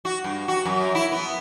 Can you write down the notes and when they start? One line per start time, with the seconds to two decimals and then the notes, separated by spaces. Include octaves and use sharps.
0.05 F#4
0.24 G2
0.48 F#4
0.65 F#2
0.95 E4
1.12 B3